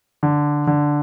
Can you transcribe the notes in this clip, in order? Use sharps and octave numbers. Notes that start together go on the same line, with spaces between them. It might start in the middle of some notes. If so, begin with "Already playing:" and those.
D3
D3